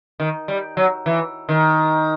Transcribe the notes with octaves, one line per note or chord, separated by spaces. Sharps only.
D#3
G3
F#3
E3
D#3